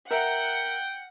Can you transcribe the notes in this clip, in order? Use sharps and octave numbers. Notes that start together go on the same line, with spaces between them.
A#4 E5 F#5 G5